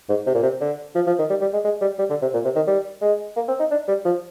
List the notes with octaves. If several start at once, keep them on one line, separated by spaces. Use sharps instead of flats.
G#2
C3
A#2
C3
D3
F3
F3
D#3
G3
G3
G#3
G#3
G3
G3
D3
C3
A#2
C3
D#3
G3
G#3
A#3
C4
D#4
D4
G3
F3